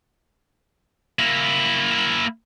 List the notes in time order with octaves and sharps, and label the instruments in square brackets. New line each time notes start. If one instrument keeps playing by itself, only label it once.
[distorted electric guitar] A#3 E4